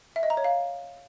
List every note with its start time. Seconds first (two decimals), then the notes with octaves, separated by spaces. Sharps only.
0.16 E5
0.23 D#5
0.30 A#5
0.37 C#5
0.44 F5